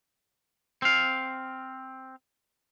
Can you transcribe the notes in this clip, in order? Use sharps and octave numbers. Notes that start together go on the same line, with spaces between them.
C4 F5